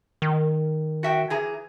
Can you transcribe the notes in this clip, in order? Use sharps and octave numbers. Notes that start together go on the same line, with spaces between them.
D#3
F#4 E5 G5
E3 G#4 A#5